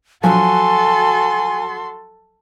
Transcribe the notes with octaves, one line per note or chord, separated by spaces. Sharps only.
F3 F#3 F#4 A4 G#5 C6